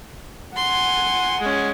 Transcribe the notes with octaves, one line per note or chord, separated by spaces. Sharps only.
F#5 G#5 C6
G#3 C#4